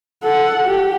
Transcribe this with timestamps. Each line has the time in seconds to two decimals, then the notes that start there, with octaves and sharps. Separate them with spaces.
0.23 A4 F#5
0.65 G4